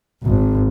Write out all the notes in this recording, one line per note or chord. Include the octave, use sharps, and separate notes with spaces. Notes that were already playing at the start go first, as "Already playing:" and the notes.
G#1